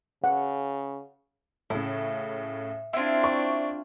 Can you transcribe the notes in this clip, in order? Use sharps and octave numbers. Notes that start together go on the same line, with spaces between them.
C#3 F#5
A2 C#3 E4
C4 D4 E4 F4
D5 C#6